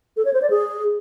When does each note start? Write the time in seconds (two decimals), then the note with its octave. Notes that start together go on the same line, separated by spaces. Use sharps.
0.17 A4
0.25 C#5
0.33 C5
0.42 D5
0.50 G#4